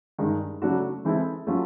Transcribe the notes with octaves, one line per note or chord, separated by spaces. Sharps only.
G2 D#3 G#3
C#3 F#3 A3 D4 F#4
E3 G#3 C4 E4 A4
F#3 A3 C#4 F4